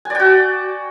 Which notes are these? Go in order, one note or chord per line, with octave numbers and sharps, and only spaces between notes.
F#4 D5 G5 G#5